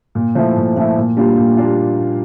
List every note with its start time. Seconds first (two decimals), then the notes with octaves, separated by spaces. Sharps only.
0.15 A#2
0.35 F3 A3 E4
0.57 A#2
0.77 F3 A3 E4
0.97 A#2
1.17 G3 A#3 D4 F4
1.37 A#2
1.57 G3 A#3 D4 F4